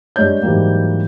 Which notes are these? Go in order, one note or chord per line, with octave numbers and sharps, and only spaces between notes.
G2 G#3 C#5 G6
G#2 E3 F#3 G3 A#3